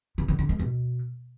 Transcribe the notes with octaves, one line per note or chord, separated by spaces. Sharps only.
C#3
D3
D3
G#3
B2